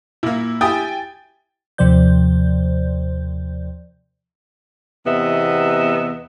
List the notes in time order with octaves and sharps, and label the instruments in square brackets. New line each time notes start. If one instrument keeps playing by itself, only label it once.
[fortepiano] A#2 A#3 [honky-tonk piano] E4
[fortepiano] E4 G4 D#6 [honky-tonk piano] G5 G#5 A6
[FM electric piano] D#2 C3 F3 C5 D5 G6
[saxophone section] E2 C3 B3 D#5 E5